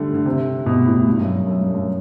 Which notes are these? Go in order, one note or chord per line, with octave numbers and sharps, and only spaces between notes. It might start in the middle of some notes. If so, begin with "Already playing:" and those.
Already playing: D3 G3 A3
D3
C3
B2
A2
G2
F#2
G2
F#2
G2
F#2